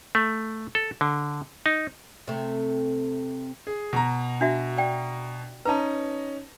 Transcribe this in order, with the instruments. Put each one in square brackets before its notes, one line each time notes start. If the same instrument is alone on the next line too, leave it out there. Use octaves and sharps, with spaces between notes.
[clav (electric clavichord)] A3
A4
D3
D#4
[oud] C3 A3
[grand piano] G#4
B2 A#5
[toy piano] D4 F#4 E5
D5 G5
[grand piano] C#4 D#4 A#5 [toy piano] B4 A5